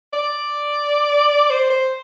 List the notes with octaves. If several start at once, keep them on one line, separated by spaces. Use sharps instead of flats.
D5
C5
C5